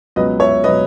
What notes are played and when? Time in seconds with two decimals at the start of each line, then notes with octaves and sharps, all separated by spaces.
0.16 C#2 B2 F#3 B4 D#5
0.40 C#5 E5
0.64 B2 F#3 B4 D#5